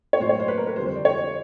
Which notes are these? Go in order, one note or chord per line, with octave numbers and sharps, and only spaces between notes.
C#5
A2 F#3 C5
C#5
C5
B4
A#4
B4
F2 D3 G3 C5
C5
D5
C#5